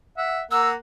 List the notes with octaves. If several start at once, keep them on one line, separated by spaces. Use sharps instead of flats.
E5 F#5
A#3 F#5 E6